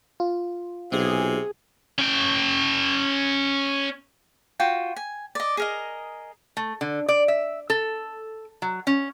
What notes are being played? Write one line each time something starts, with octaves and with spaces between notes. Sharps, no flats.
F4
B1 C3 G#4
C#4 G5
F4 F#4 G5
G#5
D5 D#5
G#4 A#4 D#5
A3
D3
D5
E5
A4
F#3
C#4